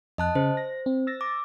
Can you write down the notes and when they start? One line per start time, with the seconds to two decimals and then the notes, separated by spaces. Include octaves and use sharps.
0.18 F2 D#5 A5 F#6
0.35 C#3 C5
0.57 A#6
0.86 C4
1.07 E6 A6 A#6
1.21 D6